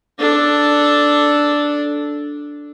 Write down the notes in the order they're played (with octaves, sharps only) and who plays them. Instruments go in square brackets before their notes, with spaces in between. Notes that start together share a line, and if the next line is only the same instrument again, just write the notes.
[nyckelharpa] D4 A4